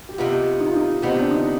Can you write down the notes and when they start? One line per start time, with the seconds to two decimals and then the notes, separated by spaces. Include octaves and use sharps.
0.09 G4
0.18 C3 D#3 B3 F4
0.61 D#4
0.68 F4
0.76 D#4
1.02 C3 D#3 B3 C4
1.19 D4
1.31 D#4